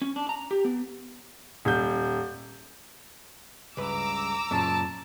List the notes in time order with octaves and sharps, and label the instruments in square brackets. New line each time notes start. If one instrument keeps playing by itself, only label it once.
[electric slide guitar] C#4
D4
A#5
G4
B3
[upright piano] D#1 G6
[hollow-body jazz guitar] C#2 G2 B4 [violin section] A#5 D6 E6
[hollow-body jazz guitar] F#2 A#2 C#3 [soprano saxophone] A5